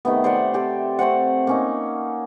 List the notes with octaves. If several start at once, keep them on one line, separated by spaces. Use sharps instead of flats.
C3 D#3 A3 B3
C5 D5 E5 F#5
C4 G4 A4 C5
A3 C4 C5 F#5
A#3 C#4 D#4